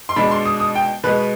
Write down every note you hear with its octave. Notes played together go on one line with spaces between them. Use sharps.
C6
B2 G#3 D4 B5
C6
D#6
D#6
G5
B2 G#3 B3 B4